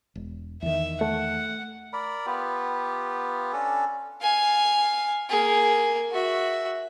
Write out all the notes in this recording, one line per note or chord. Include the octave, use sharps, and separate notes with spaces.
E1
E2 D#3 E5
A3 F#5
A#4 D5 B5
B3 F4 G4
C#4 D4 A4
F5 G#5
A#3 G#4
F#4 E5